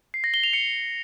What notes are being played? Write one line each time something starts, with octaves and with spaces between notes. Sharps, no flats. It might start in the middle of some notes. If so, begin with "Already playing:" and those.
C7
A#6
G7
F7
C#7